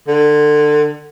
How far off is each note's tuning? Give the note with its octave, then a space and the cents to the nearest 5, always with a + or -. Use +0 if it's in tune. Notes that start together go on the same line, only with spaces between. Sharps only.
D3 +25